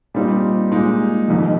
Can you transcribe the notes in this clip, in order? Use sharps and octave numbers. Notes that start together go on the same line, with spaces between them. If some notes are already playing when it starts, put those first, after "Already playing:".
A#2 G3 C4 D#4
A#2 G#3 D#4
F1 F2 D#3